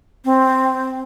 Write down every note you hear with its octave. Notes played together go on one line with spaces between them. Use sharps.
C4